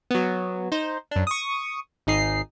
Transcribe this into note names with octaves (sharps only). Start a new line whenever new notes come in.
F#3 B3
D#4 C5
F#2 D4
C#6 D#6
G#1 D#4 G#4 C7